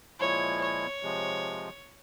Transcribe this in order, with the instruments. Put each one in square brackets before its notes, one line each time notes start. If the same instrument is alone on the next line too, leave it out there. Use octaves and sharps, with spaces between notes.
[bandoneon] A#2 F3 G#3 E4 [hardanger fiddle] C#5
[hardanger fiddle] C#5
[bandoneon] C3 F3 G#3